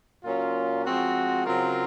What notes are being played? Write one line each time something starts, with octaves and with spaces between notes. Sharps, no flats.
A#2 F#3 C#4 F4
F3 G#3 C4 F#4
C#3 F#3 C4 F4 A#4